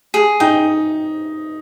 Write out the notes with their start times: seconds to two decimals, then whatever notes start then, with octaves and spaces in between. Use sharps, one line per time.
0.14 G#4
0.40 D#4 G5